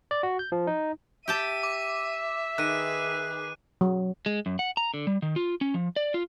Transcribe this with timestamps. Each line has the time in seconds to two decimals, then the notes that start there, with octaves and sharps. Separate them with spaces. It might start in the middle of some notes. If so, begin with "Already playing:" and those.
0.11 D5
0.23 F#4
0.39 G6
0.52 F3
0.67 D#4
1.28 G4 E5 G5 A5 D#7
1.63 D6
2.58 D#3 G#4 B4 F#6 D#7
3.81 F#3
4.26 G#3
4.46 F#2
4.59 F#5
4.77 A#5
4.94 D3
5.07 G3
5.22 D#3
5.36 F4
5.61 C#4
5.74 F3
5.96 D5
6.14 F4